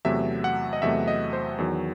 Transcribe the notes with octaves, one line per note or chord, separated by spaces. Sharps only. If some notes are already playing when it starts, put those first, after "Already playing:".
E2 C3 F#3 A3 E5
F#5
D#5
E2 C3 F#3 A3 E5
D#5
C5
E2 D#3 F#3